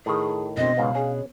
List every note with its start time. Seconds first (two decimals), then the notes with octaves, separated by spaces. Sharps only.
0.06 A2 D#3 G#4
0.57 B2 C4 D4 D#5
0.77 C#2 G#2 B3 F5
0.95 C#4 G#4